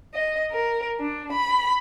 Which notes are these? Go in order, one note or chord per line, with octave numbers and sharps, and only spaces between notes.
D#5
A#4
D4
B5